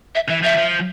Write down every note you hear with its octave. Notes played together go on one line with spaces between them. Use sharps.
E5
E3 E5
F3 E5
F3